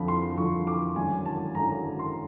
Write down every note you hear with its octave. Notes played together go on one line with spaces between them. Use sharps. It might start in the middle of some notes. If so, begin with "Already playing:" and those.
Already playing: F2 D3 F3 B5
C6
F2 D3 F3 C#6
D6
G#1 F#2 D3 F#3 G#5
A5
G#1 F#2 D3 F#3 A#5
A#5
C6